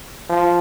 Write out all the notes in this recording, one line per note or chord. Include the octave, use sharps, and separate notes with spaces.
F3